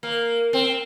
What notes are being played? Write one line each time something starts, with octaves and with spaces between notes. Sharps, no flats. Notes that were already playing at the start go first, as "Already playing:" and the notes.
A#3
C4